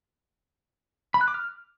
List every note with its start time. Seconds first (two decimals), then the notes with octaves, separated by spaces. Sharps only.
1.14 B5
1.21 F#6
1.28 D6
1.34 F6